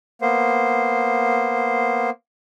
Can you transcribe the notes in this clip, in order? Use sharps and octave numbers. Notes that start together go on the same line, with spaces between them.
A#3 B3 C5